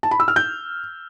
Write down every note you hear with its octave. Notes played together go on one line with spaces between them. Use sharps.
A5
B5
E6
F6
G6